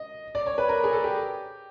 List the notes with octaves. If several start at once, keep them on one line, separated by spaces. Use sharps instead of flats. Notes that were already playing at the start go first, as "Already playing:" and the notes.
Already playing: D#5
D5
C#5
B4
A#4
G#4
A4
G4